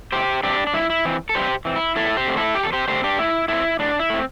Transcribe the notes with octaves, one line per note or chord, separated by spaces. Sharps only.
A2 G4 C5
G3 C4 D4 G4
D4
G2 E4
E4
E3 C4
A4
G2 G4 C5
E3 C4
E4
E2 E4 A4
G4 C5
D3 A3 C4
E4 A4
E2 G4
A4
G4 C5
D3 A3 C4 G4 C5
D4 G4
A2 E4
A3 C4 E4
A2 D4
E4
A3 C4